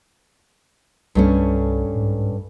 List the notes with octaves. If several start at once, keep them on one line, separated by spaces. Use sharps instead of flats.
C2 G2 A3 C#4
G#2